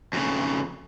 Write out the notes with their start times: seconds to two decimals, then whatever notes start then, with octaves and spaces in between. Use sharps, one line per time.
0.13 F2 C#3